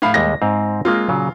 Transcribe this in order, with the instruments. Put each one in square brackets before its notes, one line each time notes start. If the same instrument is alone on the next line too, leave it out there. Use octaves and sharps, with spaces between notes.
[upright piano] A2 F5 B5
[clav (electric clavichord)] D#2 G3 G#3 [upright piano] A#6
[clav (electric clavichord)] G#2 C4 F5
[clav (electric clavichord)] G#3 A#3 C4 [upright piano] F4
[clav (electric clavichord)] A#2 C#3 F#3